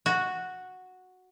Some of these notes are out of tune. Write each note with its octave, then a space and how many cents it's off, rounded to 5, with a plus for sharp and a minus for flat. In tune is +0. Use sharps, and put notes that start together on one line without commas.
F#4 -5